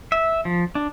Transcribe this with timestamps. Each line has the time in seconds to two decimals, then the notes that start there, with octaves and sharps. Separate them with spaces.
0.12 E5
0.45 F3
0.75 D4